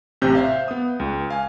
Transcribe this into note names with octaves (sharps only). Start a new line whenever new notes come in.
A1 C3 C4 G6
C5 E5 F5
B3 D#6
C#2
F5 G#5